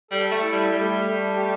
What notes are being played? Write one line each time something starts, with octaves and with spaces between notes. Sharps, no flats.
G3 A4
A3
E4
G3
G3 A3
A3
G4